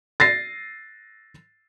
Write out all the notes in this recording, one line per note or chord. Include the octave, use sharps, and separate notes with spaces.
A6 A#6 C7